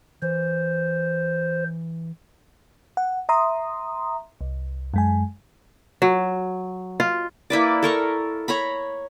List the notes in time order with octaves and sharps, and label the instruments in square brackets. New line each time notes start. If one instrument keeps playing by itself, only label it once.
[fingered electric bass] E3 [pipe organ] C5
[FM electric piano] F#5
E5 A#5 C6 D#6
C2
F#2 G#3 G#5
[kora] F#3
F4
[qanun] A#3 E4 B4 D5
A4 A#4 C#6
C#5 A#5 B5